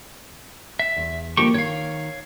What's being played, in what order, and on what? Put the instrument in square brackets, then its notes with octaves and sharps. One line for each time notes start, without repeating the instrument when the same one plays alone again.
[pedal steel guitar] E5
[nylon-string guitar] E2
[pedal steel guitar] D3 G4 C#6 [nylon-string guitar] F3 A#3
[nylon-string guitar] D#3 [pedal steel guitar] C#5 F5